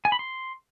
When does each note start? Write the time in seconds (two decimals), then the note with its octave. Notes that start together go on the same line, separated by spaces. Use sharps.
0.05 G#5
0.12 B5
0.19 C6